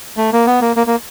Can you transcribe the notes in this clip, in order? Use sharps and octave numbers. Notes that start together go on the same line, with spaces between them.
A3
A#3
B3
A#3
A#3
A#3